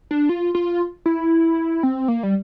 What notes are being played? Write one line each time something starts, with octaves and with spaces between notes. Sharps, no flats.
D4
F4
F4
E4
C4
A#3
G3